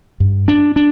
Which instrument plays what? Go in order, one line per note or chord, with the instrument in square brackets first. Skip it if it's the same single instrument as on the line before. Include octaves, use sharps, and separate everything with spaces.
[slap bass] G2
D4
D4